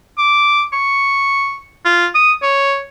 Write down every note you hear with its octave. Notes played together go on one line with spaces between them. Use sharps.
D6
C#6
F4
D#6
C#5